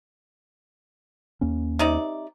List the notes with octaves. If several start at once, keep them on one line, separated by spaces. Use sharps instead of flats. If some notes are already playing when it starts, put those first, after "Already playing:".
D#2 A#3 C#4
C3 D#4 D5